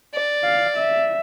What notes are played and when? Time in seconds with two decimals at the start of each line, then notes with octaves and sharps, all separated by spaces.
0.14 D5
0.43 F5
0.76 E5